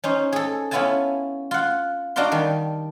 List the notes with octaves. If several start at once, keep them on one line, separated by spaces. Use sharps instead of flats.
C#4 D#4 C5
G#4 A4
B3 C#4 E4 F4 G#5 A5
F4 F#5
D4 D#4 F#4 D5 F5 C6
D#3 G3 D4